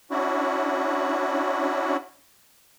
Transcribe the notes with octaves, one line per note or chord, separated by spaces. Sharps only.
C#4 D4 E4 F#4